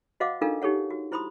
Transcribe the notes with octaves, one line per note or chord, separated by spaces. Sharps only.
F#4 C5 D#5 F5 F#5 D6
D4 D#4 F4 A4 A#4 F5
D#4 G4 A4 C#5 F#5
F#4
E4 C5 B5 C6 D#6